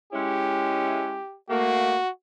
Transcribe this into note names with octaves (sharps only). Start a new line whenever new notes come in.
G#3 C#4 E4 G4
A3 A#3 F#4